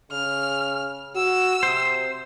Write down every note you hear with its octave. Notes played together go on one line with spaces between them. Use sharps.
C#3 F6
F#4 E6
C3 C5